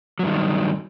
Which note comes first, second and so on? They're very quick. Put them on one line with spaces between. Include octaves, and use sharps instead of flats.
F#3 G2 D#3